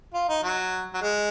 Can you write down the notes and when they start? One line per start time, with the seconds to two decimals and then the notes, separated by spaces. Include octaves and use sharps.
0.14 F4
0.29 D#4
0.43 F#3
0.94 F#3
1.02 G#3